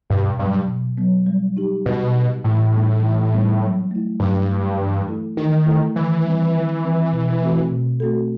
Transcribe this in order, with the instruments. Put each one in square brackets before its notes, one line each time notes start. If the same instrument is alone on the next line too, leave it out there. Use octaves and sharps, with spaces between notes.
[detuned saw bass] G2 [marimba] B2
[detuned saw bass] G2 [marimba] F#3 B3
[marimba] B2
F#3 B3
G3
D#4 G4
[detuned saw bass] B2 [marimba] G3
[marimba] D#4 G4
[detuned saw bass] A2 [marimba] E3
[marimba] G3 B3 D#4
E3
G3 B3 D#4
F#3
A3 E4
[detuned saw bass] G2 [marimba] F#3
[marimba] A3 E4
E3
A3 E4 A4
[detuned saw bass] D#3 [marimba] E3
[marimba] A3 E4 A4
[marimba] D#3 [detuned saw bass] E3
[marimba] G3 C4
D#3
G3 C4
B2
A3 C4 F#4 A4
B2
A3 C4 F#4 A4